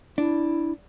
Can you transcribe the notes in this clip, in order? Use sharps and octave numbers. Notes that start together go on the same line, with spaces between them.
D4 E4